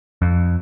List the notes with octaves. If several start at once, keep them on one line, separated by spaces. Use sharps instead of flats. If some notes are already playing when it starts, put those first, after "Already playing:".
F2